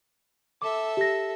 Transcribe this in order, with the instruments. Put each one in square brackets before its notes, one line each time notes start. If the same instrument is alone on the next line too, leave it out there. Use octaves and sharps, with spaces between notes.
[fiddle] A4 E5 [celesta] D6
[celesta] G4 A#6